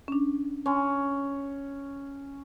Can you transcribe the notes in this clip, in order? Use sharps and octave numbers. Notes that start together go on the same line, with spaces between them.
C#4 D4
C#4 G#5 C6